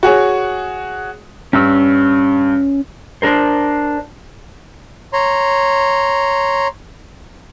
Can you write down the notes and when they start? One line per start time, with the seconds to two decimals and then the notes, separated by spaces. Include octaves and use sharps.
0.03 F#4 G#4 C#5
1.53 G2 C#4 E6
3.22 D4 A#4 C5
5.13 C#5 A#5 C6